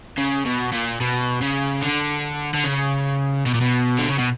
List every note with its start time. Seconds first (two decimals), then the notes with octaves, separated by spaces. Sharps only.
0.18 C#3
0.46 B2
0.72 A#2
1.00 B2
1.41 C#3
1.82 D3
2.54 D3
2.65 C#3
3.46 B2
3.54 A#2
3.61 B2
3.98 D3
4.09 C#3
4.18 B2